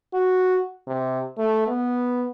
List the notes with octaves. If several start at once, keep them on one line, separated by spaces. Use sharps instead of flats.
F#4
C3
A3
B3